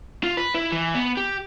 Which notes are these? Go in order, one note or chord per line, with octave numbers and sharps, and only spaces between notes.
F4
B4
E4
E3
B3
G4